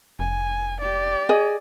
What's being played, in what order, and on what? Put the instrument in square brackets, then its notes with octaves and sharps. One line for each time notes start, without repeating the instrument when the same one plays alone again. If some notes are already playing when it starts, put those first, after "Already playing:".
[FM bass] F1 [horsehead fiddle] G#5
[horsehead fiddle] G4 D5
[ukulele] G#4 D#5